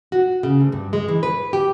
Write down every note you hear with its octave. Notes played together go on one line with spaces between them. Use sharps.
F#4
C#3
D2
G2
G#3
E3
B4
G4